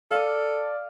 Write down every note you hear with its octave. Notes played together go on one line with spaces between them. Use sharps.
A4 D5 F5 D#6